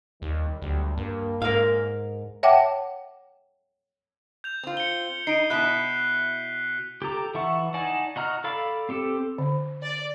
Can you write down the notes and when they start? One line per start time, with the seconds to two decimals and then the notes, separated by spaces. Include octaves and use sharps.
0.22 D#2 D#3 G3
0.62 D2 F#3 G3
0.97 G2 A#3
1.42 G#2 A#4 F5
2.43 C#5 E5 F#5 G5 A5 D6
4.44 G6 F7
4.63 C4 F4
4.77 C#7 G7
5.27 D#4 C7 D7 D#7
5.50 B2 E4 F#6 B6
7.02 G4 A4 A#5
7.35 E3 E5 F#5 A5 C#6
7.74 D#4 D5 F#5 G#5 A5
8.16 F#4 D#5 A#5 F6
8.44 A4 D5 F5 B5
8.89 C4 G4 A4
9.38 D3
9.82 D5